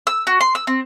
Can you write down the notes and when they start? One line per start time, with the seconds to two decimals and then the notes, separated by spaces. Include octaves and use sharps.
0.07 E6
0.27 F#4
0.41 C6
0.55 E6
0.67 C4